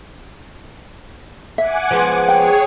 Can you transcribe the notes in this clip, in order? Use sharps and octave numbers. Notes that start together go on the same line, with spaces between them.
E5 F#5 G#5 D6
F3 G#3 B3
G#4 C#5 G5